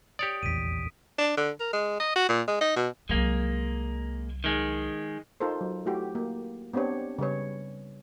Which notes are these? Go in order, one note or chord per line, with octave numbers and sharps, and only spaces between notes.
G4 C#5 D5 D#6 D7
F1 A#1 E2 B6 D7 D#7
D4
D3
A#4
G#3
D#5
F#4
A#2
G#3
D#4
B2
C2 F#3 G#3 A#3
D#3 G#3
D#4 F4 A4 A#4 C5
F#3
A3 E4 F#4 G4
A#3
B3 C4 D4 G4 C#5
C#3 G3 B4 C#5